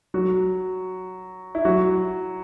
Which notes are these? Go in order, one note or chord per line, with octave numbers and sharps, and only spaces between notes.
F#3 F#4
E4
F#3 F#4